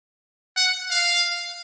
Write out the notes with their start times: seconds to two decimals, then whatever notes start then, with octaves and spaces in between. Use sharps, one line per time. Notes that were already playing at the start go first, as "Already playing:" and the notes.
0.56 F#5
0.90 F5